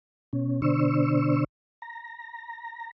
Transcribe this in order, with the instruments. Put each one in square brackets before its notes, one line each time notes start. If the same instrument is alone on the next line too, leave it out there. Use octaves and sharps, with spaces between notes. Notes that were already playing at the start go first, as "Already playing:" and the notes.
[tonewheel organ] B2 C#4
B2 D3 D4 C5 C#6 E6
A#5